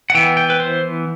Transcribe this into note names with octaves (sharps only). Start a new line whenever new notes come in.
F#5
E3 B3 G5
G5
B4
C5